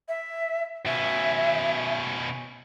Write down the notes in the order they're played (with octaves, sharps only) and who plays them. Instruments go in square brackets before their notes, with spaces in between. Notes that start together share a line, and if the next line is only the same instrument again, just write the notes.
[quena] E5
[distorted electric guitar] B2 C#4 [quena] E5